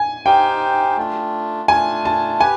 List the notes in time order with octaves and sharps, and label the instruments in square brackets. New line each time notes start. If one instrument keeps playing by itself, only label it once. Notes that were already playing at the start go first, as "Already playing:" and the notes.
Already playing: [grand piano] G#5
[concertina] D#4 G4 C5 F5 [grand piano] G5
[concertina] A3 D4 F4
[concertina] A3 D4 F4 [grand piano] G#5
[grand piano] A5
[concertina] G4 B4 [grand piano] G#5